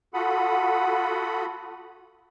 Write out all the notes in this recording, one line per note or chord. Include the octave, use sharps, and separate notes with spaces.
F4 F#4 A4 F#5 B5 D#6